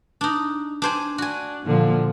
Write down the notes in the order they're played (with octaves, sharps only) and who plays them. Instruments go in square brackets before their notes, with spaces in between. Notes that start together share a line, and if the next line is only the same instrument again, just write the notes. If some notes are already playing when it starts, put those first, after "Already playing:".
[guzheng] D4 D#4
D4 C5 G#5
[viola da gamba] D4 [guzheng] F#4 G#5
[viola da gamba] A#2 D3 F3